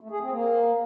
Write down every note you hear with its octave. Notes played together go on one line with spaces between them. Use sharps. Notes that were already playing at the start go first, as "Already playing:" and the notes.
A3
G#4
C4
A#3